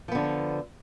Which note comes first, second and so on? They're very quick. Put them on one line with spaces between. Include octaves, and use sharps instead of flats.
F3 B3 D3